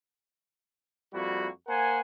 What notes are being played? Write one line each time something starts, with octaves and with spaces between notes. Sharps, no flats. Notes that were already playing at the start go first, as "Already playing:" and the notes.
F2 G3 A#3 E4 F#4
A#3 A#4 C5 F#5 G#5